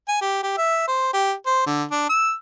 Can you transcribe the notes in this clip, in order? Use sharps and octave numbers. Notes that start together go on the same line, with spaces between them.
G#5
G4
G4
E5
C5
G4
C5
D3
D4
E6